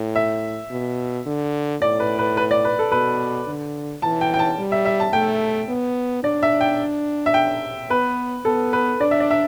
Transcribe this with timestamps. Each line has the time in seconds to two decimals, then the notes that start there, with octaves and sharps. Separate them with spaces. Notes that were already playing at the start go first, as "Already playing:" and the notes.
Already playing: A2
0.15 E5
0.71 B2
1.26 D3
1.82 A2 D5
2.00 B4
2.19 B4
2.37 B4
2.51 D5
2.65 B4
2.79 A4
2.92 B2 B4
3.47 D3
4.02 E3 A5
4.21 G5
4.34 G5
4.39 A5
4.58 G3
4.72 E5
4.85 E5
5.00 A5
5.13 A3 G5
5.68 B3
6.23 D4 D5
6.43 E5
6.61 G5
7.26 E5
7.34 G5
7.90 B3 B4
8.45 B3 A4
8.73 B4
9.01 D4 D5
9.11 E5
9.20 D5
9.31 E5